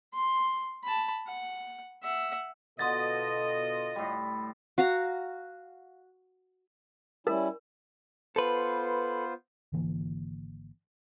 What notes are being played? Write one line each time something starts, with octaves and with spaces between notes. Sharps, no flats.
C6
A5 B5
F#5
E5 F#5
B2 D3 F4 A4 D#5 C6 D#6 A6
A2 G3
F#4 F5 A#5
G3 C#4 E4 A#4
B3 F4 A4 B4 C5
G#1 D3 E3 A#3